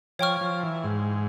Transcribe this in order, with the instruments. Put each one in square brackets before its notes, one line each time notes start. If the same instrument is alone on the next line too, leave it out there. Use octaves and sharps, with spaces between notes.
[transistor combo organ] F3 [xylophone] C#5 G5 C#6 F6
[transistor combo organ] F3
E3
G#2